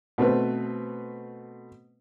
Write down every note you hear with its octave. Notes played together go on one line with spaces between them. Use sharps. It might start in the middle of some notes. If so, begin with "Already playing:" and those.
B2 A3 C4 B4